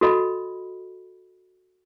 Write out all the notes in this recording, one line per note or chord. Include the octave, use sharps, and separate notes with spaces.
F#4 A4 D#5 B5